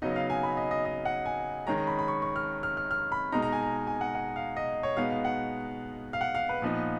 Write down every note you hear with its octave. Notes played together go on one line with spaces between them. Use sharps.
C#3 F#3 B3 D#4 D#5
F5
G#5
B5
D#5
D#5
D#5
F#5
G#5
D#3 G#3 C#4 A#5
A#5
B5
B5
C#6
C#6
F6
F6
F6
F6
B5
B2 G#3 D#4 A#5
A#5
G#5
A#5
G#5
F#5
F#5
F5
D#5
C#5
B2 G#3 B3 D#4 F5
F5
F#5
F5
F#5
F5
B4
A#2 F3 B3 D#4